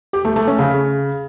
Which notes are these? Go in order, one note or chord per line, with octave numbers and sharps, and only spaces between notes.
G4
A3
A3
C#4
C#3